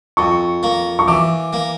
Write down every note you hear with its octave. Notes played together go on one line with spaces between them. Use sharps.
F2 C#6
A#3
C#6
E3 D6
A#3